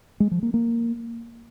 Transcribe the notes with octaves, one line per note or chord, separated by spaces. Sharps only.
G#3
F3
A#3
A#3